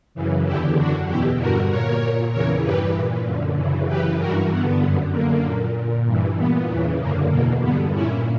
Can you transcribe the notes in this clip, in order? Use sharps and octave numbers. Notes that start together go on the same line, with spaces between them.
F#2 C#3 E3
E2 D3 E4 G4
F#2 D3 D4 F#4
E2 B2 E4 G4
G2 D3 F#4 A#4
A#2 A#4 C#5
A#2
E2 C#3 E3 A#4 C#5
G2 E3 G4 B4
A#2
F#2 D3
F#2 C#3 E3
F#2 C#3 E3 G4 B4
G2 E3 F#4 A#4
G2 D3 B3
F#2 D3
F#2 D3 A#3
A#2
A#2
G2 E3
A#2 B3
E2 C#3 E3
F#2 D3 A#3
E2 B2 A#3
G2 D3 B3
A#2 C#4 E4